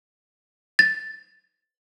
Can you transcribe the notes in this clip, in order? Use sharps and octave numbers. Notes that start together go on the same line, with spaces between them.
A6